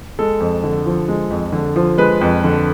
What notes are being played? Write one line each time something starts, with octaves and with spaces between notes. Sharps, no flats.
G#3 A4
F2
D3
F3
G#3
F2
D3
F3
G#3 B4
F2
D3